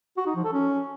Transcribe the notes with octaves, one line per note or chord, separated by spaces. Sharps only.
F#4
D#4
F3
A4
C#4